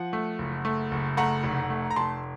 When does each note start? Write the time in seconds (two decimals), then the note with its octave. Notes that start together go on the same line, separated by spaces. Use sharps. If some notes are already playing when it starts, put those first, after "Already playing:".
Already playing: F3 F#5
0.13 A3
0.39 F#1
0.65 A3
0.91 F#1
1.17 A3 F#5 A#5
1.44 F1
1.70 A3
1.91 A#5
1.96 F1 A5 C6